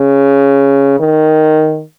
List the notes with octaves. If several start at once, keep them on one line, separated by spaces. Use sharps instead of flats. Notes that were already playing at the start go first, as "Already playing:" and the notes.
Already playing: C#3
D#3